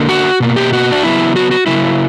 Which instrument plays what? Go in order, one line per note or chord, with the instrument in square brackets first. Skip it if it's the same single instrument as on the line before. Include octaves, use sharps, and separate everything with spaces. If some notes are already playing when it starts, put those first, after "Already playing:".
Already playing: [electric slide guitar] D3 A#3
F#4
B2 A#3
G4
F#4
D4
C#3 F#3 B3 E4
F#4
F#4
C#3 F#3 A#3 E4